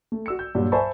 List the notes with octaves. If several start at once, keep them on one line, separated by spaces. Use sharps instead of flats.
A3
F#4 E6 C#7
G6
G2 A#2 F#3 G3
C5 E5 G#5 A5 B5 C#6